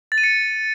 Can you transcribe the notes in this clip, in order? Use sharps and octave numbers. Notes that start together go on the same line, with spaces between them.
A6
D#7
C#7